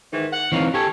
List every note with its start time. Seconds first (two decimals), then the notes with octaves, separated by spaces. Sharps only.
0.13 G#2 D#3 E3
0.33 F#5
0.52 E3 C4 D#4 C#5 F5
0.74 D#3 G4 A4 C#5